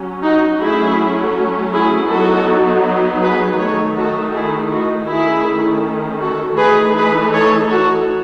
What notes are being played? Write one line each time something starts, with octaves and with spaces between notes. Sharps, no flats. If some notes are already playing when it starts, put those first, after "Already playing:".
Already playing: F#3 C#4
D#4 F#4
F#3 A3 C#4 E4 G#4
E4 G#4
F#3 B3 D#4 F#4 A4
G#4 B4
D#3 A3 D#4 A4 C#5
F#4 A4
E4 G#4
D#4 F#4
D#3 A3 C#4 E4 G#4
F#4 A4
E3 A3 D#4 G#4 B4
G#4 B4
A4 C#5
F#4 A4